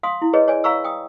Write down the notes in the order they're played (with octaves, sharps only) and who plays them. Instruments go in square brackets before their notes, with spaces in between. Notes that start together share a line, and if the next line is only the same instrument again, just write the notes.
[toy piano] F5 C6 D#6
E4
G#4 B4 C#5 D#5
C#5 D5 G#5
F5 A#5 B5 C#6 E6
G5 D#6